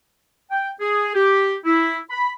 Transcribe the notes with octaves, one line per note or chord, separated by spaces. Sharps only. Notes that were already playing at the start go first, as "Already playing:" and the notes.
G5
G#4
G4
E4
B5